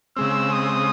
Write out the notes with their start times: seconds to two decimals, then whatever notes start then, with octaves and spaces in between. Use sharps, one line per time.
0.16 C#3 G#3 C4 E6
0.52 D#6